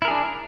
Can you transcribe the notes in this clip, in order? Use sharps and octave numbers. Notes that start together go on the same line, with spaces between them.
D4 E4 G#4 A#4